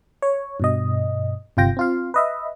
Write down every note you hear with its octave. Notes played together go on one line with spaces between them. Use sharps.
C#5
G2 B2 D#5
G1 C3 F4 G5 A#6
C4 F4 F5
B4 D#5 E5